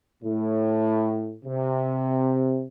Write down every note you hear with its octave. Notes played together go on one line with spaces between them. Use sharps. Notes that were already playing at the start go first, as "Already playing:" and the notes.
A2
C3